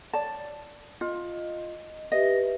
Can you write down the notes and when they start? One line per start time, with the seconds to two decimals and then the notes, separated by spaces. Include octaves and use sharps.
0.13 C#5 D5 A5
1.01 F4 D#5
2.12 G4 B4 D#5 E5